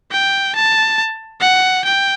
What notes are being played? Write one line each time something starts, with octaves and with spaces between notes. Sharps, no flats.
G5
A5
F#5
G5